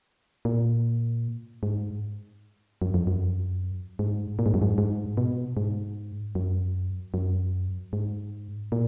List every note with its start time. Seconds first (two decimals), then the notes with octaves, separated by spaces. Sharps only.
0.45 A#2
1.63 G#2
2.82 F#2
2.94 F2
3.07 F#2
3.99 G#2
4.39 A#2
4.46 G#2
4.54 F#2
4.62 G#2
4.78 G#2
5.17 B2
5.57 G#2
6.35 F#2
7.14 F#2
7.93 G#2
8.72 A#2